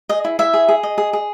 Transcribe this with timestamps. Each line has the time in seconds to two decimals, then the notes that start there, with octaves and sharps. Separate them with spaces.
0.09 G#4 D#5
0.25 E4
0.39 E4 E5
0.54 G#4
0.69 G#4
0.83 D#5
0.98 G#4
1.13 G#4